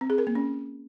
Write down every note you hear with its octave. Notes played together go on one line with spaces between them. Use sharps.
C4
G#4
A#4
A#3
C#4